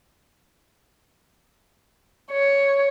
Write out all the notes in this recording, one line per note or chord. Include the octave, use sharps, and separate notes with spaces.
C#5